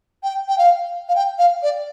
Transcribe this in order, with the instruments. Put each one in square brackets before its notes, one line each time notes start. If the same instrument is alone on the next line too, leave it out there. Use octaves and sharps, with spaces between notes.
[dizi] G5
G5
F5
F5
G5
F5
D5